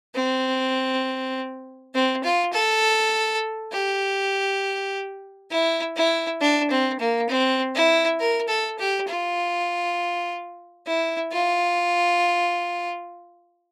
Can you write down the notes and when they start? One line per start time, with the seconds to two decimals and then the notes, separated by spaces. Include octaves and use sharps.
0.15 C4
1.94 C4
2.24 F4
2.53 A4
3.72 G4
5.51 E4
5.96 E4
6.41 D4
6.71 C4
7.00 A#3
7.29 C4
7.75 E4
8.20 A#4
8.48 A4
8.79 G4
9.08 F4
10.87 E4
11.32 F4